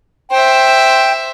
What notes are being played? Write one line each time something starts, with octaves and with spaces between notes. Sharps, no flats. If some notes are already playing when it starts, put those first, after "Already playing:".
C5 E5 G5